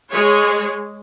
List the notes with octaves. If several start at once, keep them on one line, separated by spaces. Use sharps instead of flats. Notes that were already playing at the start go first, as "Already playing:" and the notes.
G#3 G#4 C#5